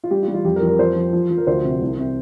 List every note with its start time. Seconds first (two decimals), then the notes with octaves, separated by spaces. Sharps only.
0.04 F4
0.11 G3 G4
0.22 F4
0.28 G3
0.34 F4
0.45 F2 G4
0.56 A#4
0.62 F2
0.67 A#4
0.79 F3 C5
0.96 F3
1.13 F3
1.30 F3
1.37 A#4
1.47 D2 C5
1.64 C3
1.81 C2
1.98 C3